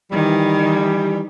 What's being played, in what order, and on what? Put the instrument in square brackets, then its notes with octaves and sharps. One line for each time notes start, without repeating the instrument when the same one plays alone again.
[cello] D#3 [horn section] E3 G3